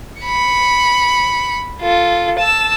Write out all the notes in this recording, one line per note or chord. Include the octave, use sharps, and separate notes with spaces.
B5 C#7
F4 A4
A5 E6